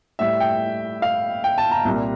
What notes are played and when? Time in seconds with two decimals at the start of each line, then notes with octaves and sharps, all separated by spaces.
0.19 A2 G3 E5
0.40 G5
1.02 F5
1.44 G5
1.58 A5
1.71 A#5
1.85 C2 A#2 G3